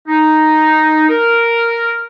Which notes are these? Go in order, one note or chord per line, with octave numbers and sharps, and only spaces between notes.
D#4
A#4